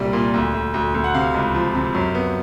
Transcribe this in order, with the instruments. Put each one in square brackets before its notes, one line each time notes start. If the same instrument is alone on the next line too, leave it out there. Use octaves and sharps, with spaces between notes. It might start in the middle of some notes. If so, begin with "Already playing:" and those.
Already playing: [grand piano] C2 A#2 G3 D5
A#2
D2
D2
D2
D2
F#5
C3 F5
C#2
F3
C3
F#2
B3